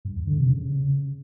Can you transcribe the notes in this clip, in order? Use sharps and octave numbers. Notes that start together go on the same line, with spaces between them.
G2
E2
D3
C3
C#3